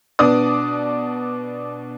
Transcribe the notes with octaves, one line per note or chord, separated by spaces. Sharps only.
B2 B3 D4 D5 D#6